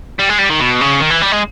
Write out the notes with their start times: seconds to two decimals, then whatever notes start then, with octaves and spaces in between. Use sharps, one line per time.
0.19 G3
0.29 G#3
0.38 G3
0.50 D#3
0.60 B2
0.81 C#3
1.00 D#3
1.10 E3
1.22 G3
1.32 G#3